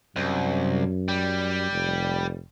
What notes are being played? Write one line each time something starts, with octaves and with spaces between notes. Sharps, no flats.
C2 F#2
G3
F1